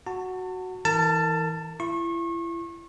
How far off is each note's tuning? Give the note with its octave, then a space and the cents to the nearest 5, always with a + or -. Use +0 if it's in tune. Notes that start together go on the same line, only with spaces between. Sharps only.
F#4 +0 A5 +35
E3 -25 A#4 -35 A5 +10
E4 +35 C#6 -35